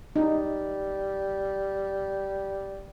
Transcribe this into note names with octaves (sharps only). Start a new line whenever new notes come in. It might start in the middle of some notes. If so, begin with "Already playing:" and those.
G3 D#4